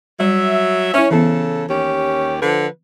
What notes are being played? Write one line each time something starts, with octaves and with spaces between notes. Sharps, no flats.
F#3 G3 E5
C#4 E4 E5
C#3 E3 B3 A4
D#2 C#4 G4
D3 F3 B4